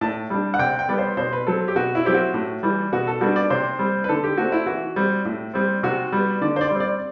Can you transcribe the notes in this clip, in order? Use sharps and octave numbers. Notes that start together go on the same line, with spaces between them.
A2 A5
G3 D4
F#5
C3 G5
G5
G3 B3 D5
C5
B2 C5
B4
F#3 C4 A4
G4
B2 F#4
E4
F#3 C4 G4
F#4
A2
E3 G3
B2 F#4
A4
G3 B3 D4 F#4
D5
C3 C5
G3 C4
B4
D3 A4
G4
A3 C4 F#4
E4
E3 F#4
G3 C4
A2
G3 C4
C3 F#4
G3 B3
D3 D5
C5
D5
G3 C4
D5